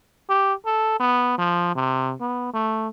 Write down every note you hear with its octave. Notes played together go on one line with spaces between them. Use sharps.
G4
A4
B3
F3
C3
B3
A3